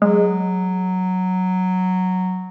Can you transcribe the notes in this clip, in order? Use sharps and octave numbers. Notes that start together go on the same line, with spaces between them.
F#3 G#3